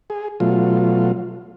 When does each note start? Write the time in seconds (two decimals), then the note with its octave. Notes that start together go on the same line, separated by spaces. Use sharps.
0.10 G#4
0.40 B2 F#3 A3 F4